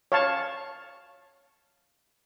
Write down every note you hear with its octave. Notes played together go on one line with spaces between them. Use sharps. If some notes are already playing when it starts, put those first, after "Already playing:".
C#5 F5 A5